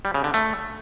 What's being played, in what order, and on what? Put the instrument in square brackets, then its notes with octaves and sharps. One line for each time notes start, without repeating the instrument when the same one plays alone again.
[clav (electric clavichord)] G3
C#3
D3
A3